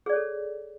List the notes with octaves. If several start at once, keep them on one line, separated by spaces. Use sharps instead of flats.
G#4 A4 C#5 D5